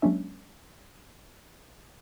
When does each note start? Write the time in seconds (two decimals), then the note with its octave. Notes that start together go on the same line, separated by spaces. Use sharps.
0.02 F#3 G#3 A#3 C#4 D4 E5